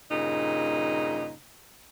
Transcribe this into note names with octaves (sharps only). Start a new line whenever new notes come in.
G2 A#2 C#3 D#4